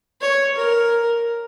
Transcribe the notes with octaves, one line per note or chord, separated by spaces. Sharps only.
C#5
A#4